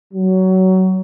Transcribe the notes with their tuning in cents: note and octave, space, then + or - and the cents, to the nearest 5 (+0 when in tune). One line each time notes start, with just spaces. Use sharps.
F#3 +20